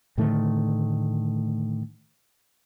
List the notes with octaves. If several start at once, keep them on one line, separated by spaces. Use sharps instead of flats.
A2 D3 D#3 A3